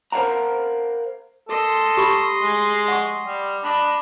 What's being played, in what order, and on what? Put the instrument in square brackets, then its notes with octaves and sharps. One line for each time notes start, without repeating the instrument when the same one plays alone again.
[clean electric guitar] A#4 C5 C#5 F5 F#5 A#5
[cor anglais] A4 [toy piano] A#4 [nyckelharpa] D#5 C6
[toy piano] G4 B5 C#6
[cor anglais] G#3
[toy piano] F#5 C#6
[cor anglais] G3
[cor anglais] D4 [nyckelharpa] D#5 B5